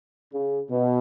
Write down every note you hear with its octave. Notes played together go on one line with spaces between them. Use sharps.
C#3
B2